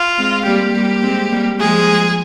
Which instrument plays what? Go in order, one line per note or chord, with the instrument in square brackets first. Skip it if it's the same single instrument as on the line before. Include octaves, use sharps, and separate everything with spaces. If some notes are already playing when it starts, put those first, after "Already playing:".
Already playing: [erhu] F4
[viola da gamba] G#3 C4
[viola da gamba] G3 A#3 [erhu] G4
[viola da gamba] G3 A#3
G#3 C4
G3 A#3
[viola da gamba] F3 G#3 [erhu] G#4